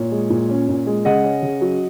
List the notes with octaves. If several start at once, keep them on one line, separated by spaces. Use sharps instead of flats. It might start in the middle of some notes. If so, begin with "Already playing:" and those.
Already playing: A#2 C#5
G#3
A#2
C#4
A#2
G#3
C#3 D#5 F#5
C#4
C#3
F#3